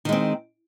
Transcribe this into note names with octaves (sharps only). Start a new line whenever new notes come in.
D#3 G#3 C4